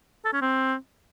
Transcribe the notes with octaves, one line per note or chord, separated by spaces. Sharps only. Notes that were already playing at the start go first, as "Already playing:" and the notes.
A4
C#4
C4